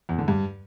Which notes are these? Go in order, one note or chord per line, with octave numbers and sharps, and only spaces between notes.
E2
D3
G2